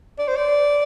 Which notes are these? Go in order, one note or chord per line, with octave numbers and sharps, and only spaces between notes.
D5
C5
D5